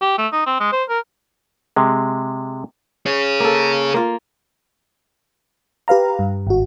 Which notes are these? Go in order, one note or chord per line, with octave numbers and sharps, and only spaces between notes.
G4
A3
D#4
C4
G#3
C5
A#4
C3 G#3
G#4 C#5
A#3 A4
A#3 F4
G4 B4 F5 A#5
G2
G#1 F#4